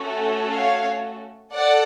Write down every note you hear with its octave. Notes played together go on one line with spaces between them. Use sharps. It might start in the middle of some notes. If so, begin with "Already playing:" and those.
Already playing: A3 C#4 F#4 A4
C#5 F5
A4 D5 F#5